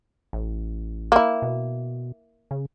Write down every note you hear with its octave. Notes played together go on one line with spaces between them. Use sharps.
A1
A#3 E4
B2
C#3